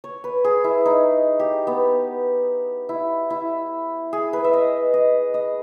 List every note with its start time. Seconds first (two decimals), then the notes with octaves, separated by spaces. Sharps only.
0.04 C#5
0.24 B4
0.44 G#4
0.64 E4
0.85 D#4
1.40 G4
1.67 B3
2.89 E4
3.30 E4
4.13 G#4
4.33 B4
4.44 E5
4.53 D#5
4.94 D#5
5.34 D#5